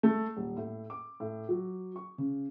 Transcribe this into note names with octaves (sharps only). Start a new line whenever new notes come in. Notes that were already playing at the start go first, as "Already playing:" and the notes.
A3
D#1
A2
D6
A2
F#3
C#6
C#3